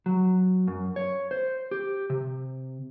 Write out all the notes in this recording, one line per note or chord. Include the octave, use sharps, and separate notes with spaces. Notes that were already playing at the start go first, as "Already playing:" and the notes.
F#3
F#2
C#5
C5
G4
C3